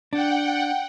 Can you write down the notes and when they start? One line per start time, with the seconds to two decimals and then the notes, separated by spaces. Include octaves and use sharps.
0.13 D4 F#5 G5